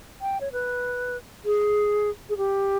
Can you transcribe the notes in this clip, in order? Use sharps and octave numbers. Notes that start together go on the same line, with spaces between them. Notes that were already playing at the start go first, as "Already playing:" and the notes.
G5
C#5
B4
G#4
G#4
G4